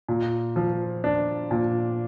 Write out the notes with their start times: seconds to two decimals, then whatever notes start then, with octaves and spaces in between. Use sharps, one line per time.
0.09 A#2
0.56 F3
1.04 D4
1.51 A#2